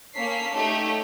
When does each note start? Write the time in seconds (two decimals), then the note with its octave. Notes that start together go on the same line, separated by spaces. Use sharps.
0.15 A#3 C#4 A4 B6 C7
0.54 A3 D#4 G4 C#5